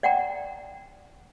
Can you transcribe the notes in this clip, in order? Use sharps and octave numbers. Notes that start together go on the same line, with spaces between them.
D5 F#5 G5 A#5